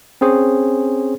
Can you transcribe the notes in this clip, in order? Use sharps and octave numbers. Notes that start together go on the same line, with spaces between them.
C4 C#4 G#4 C5 C#5